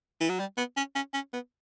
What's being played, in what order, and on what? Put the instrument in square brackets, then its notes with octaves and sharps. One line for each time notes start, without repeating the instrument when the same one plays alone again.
[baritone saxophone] E3
F#3
G3
B3
C#4
C#4
C#4
B3